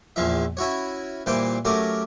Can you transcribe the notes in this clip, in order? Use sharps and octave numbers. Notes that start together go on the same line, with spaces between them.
A#1 E2 F3 F4 E5
C#4 E4 F#4 C#5
A#2 E3 G3 C5 G5
F#3 A3 C#4 G4 A#4